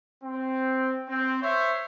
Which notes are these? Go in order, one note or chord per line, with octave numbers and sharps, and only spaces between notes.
C4
C4
C5 C#5 E5